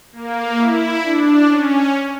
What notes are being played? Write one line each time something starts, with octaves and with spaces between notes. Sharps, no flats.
A#3
E4
D4
C#4